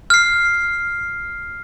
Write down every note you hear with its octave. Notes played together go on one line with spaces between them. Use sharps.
F6 C7